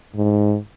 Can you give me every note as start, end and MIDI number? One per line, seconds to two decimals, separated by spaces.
0.16 0.57 44